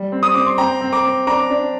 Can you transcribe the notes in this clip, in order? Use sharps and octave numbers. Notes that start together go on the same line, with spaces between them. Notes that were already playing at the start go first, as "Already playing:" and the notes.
Already playing: G3
C4
D#6
C4 D6
C6
C4 G5 A#5
C4
A#5 D6
C4
D4 A#5 D6
D4